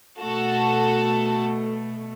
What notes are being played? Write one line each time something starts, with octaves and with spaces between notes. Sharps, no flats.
B2 A3 F#4 A4